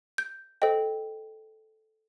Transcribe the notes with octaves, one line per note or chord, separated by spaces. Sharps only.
G6
A4 C5 D#5 G5